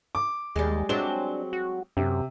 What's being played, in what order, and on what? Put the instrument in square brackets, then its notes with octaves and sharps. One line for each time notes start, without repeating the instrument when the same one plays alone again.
[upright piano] D6
[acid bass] D#2 [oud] G3 G#3
[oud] F#3 G#3 C4 [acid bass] D4 [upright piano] G7
[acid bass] F#4
[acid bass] F#2 [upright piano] C3